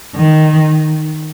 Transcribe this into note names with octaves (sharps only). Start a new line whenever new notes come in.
D#3